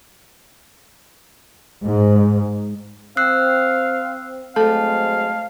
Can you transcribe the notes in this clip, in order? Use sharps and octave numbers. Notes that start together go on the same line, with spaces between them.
G#2
C4 F5 E6 F#6 C7
F#3 G#3 A3 C4 A4 F5 A5